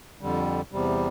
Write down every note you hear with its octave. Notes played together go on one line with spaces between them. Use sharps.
F2 D3 G3
E2 C3 G3